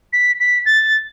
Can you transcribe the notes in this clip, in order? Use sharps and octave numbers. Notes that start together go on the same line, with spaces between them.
B6
B6
A6